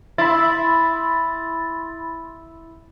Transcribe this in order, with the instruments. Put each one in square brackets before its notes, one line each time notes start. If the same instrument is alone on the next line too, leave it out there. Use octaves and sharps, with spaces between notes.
[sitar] E4 [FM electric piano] B5 C6 A6